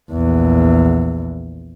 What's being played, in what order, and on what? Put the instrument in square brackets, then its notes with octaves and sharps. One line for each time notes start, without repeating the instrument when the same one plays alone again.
[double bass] A#1 E2